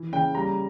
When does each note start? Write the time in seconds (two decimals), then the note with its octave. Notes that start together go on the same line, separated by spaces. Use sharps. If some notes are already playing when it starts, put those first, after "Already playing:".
Already playing: E3
0.13 C#3 G5
0.35 G3 A#5